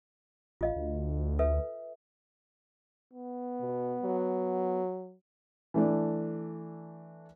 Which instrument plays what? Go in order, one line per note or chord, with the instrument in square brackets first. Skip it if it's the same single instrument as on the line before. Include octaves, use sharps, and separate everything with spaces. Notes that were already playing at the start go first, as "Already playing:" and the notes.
[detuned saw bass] A1 [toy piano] F4 D#5 F5
[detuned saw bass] D2
[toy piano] A4 B4 E5
[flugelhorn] B3
[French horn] B2
F#3
[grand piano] E3 A3 D4